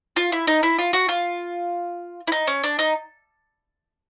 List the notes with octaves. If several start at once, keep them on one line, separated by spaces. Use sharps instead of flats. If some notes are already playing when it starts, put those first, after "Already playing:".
F4
E4
D#4
E4
F4
F#4
F4
E4
D#4
C#4
D4
D#4